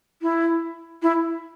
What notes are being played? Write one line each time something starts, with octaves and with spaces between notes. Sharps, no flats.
E4
E4